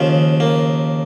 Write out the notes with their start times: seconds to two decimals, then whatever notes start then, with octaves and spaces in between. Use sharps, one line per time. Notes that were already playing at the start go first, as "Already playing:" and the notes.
Already playing: D#2 C#3 F3
0.40 A#3